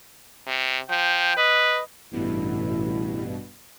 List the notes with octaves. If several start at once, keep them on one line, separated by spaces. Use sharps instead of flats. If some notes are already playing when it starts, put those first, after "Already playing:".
C3
F3 G5
B4 D#5
A1 G2 B2 E4